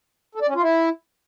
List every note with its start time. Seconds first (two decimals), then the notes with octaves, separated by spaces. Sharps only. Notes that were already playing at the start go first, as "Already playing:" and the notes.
0.35 A4
0.42 D5
0.48 C#4
0.55 F4
0.62 E4